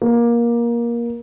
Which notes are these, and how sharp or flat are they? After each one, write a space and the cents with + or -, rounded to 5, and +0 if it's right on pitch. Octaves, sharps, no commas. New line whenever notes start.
A#3 +20